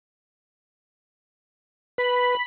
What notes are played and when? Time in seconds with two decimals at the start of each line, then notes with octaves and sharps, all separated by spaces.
1.98 B4 B5